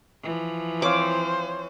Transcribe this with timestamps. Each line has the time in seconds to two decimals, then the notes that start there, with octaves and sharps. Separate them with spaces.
0.23 E3 F3
0.82 C4 C5 C#5 F5 D6